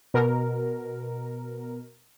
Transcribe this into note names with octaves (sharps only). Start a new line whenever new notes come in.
B2 A#4